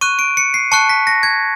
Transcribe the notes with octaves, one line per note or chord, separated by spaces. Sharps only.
C#6 F#6 D#7
D7
C#7
C7
A5 C#6 F#6 C#7
B6
A#6
G#6